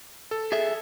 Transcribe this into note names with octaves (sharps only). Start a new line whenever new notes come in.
A4
G#4 E5